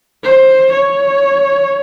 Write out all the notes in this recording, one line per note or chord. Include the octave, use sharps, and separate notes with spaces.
C5
C#5